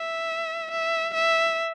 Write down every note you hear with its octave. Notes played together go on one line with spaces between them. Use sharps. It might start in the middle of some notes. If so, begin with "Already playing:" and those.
Already playing: E5
E5
E5